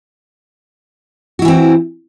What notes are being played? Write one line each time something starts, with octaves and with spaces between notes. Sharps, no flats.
E3 C4 E4 F#4